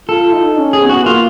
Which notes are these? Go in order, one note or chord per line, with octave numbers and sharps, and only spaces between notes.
F4 A4
D#4
C#4
G#4
B3
F#4
A#3 F4